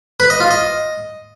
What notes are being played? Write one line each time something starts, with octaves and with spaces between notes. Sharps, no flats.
B4
D#5
F4
D#5